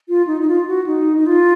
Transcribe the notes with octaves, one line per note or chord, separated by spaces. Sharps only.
F4
D#4
D#4
F4
F#4
D#4
D#4
F4